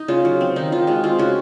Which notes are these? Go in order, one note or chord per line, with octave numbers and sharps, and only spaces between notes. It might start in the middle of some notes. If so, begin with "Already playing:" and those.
Already playing: D#4
C#3 F4
F#3
C4
D#3 D#4
D#3 F4
G#3 F#4
C4 F4
C#3 F#4